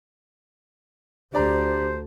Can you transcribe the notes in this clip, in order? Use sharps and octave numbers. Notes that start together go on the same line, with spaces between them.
D2 D3 G4 C5 D5 A#5